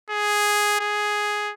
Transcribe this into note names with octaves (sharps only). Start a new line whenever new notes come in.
G#4
G#4